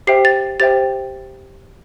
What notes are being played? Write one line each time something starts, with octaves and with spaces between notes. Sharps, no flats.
G4 C5 E5 G5 C7
A6
G4 C5 E5 G5 A6